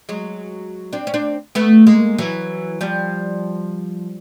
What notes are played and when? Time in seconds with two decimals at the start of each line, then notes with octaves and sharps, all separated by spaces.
0.09 F#3 G#3
0.93 C4 D4
1.07 C#4
1.14 C4 D4
1.55 A3 B3
1.87 G#3 A#3
2.18 E3 F#3
2.81 F3 G3